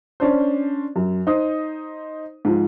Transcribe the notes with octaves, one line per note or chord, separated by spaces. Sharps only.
C#4 D4 C5
F#2
D#4 C5 D#6
G#2 F3